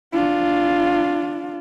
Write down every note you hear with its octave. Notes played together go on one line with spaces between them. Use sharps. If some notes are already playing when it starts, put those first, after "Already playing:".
D4 F4